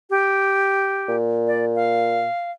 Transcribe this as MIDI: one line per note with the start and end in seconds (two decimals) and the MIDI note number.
0.10 1.15 67
1.08 2.27 46
1.47 1.65 74
1.75 2.51 77